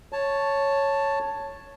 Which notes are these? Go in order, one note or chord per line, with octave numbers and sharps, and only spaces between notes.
C#5 A5